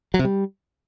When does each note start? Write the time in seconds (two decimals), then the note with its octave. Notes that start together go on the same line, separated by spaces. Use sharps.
0.14 F#3
0.19 C3
0.25 G3